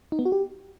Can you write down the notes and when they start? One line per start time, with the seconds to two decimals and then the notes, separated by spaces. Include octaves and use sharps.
0.12 D#4
0.19 B3
0.25 F#4
0.32 G4